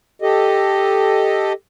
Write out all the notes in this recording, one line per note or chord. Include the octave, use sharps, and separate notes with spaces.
G4 A4 D#5